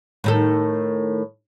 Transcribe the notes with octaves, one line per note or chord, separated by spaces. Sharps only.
A2 D#3 A4